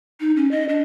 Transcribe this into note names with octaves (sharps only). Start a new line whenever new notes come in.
D#4
C#4
D#5
D4